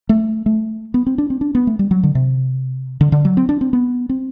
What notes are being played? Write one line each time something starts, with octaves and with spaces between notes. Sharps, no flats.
A3
A3
B3
C4
D4
C4
D4
B3
A3
G3
F#3
D3
C3
D3
D3
F#3
C4
D4
C4
B3
C4